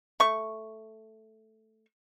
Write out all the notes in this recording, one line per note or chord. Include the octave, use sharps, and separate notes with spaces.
A3 C#6